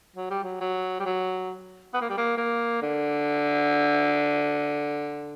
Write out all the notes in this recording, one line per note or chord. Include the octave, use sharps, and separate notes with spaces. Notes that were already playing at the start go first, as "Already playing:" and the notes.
F#3
G3
F#3
F#3
G3
F#3
B3
A#3
G3
A#3
A#3
D3